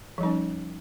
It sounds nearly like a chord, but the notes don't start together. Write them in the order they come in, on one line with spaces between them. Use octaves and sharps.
F3 G3 D#4 C#4